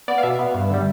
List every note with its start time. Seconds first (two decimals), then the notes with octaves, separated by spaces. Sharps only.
0.08 B3 D5
0.18 F5
0.23 B2 E5
0.39 B3
0.54 G2
0.70 D3 G3